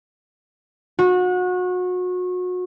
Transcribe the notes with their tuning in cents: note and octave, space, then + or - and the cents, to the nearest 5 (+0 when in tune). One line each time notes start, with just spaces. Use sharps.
F#4 -30